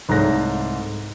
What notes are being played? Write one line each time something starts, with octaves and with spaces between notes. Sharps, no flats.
C2 G#2 A3 C#5 F#6 A#6